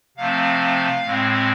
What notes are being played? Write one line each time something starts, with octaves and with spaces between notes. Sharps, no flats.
C3 F3 A3 C4 F5
A2 G#3 C4